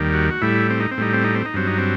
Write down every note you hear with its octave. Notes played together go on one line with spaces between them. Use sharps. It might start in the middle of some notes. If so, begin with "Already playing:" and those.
Already playing: D#2 D#3 G3
F#4
F#4
A2 G3 E4
C4
D#4
C4
A2 G3 D#4
C4
D#4
C4
D#4
G2 F#3 C4
D#4
C4